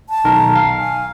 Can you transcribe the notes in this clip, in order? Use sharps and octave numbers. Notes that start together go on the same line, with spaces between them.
A5
B1 D#3 A#4
F5
G#5